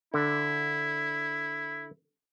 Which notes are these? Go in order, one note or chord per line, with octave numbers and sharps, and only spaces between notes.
D3 E4